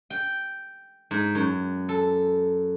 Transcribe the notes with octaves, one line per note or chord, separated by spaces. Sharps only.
G5
G#2
F#2
A4